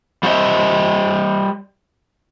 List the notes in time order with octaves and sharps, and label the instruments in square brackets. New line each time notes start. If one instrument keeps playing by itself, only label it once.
[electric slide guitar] G3 F4 F#4 C5 D#5 E5